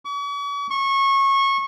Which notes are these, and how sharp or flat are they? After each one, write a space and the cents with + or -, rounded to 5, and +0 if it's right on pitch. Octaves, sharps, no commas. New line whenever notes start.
C#6 +45
C#6 -20